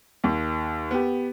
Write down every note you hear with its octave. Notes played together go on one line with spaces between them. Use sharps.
D#2
B3 G4